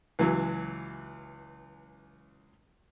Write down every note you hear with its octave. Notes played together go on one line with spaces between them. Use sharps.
C#2 E3 F#3